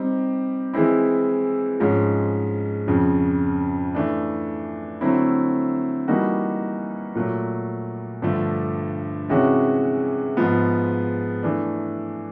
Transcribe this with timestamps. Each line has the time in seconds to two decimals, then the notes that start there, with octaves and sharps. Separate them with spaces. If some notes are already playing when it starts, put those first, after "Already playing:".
Already playing: G3 C4 D#4 G4
0.74 E3 G#3 C4 E4
1.80 G#2 F3 G#3 C#4
2.87 F2 C#3 F3
3.95 E3 A3 D4
5.01 D3 F#3 A3 C4 E4
6.08 E3 G3 A#3 D#4 F#4
7.15 A#2 F#3 A3
8.22 G2 D3 F3 A3
9.29 C3 E3 G#3 C#4 F#4
10.37 G#2 F3 G#3 B3
11.43 E3 A3 D4